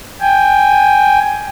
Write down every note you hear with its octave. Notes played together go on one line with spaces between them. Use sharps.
G5 G#5